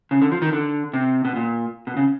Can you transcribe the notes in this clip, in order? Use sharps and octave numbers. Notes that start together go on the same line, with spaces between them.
C#3
D3
F3
D#3
D3
C3
B2
A#2
B2
C#3